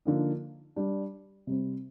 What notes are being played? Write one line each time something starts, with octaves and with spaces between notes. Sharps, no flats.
D3 F3 A#3 D#4
G3 D4 G4
C3 G3 C4